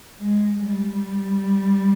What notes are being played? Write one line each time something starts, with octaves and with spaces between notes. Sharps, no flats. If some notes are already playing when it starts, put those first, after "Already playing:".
G#3
G3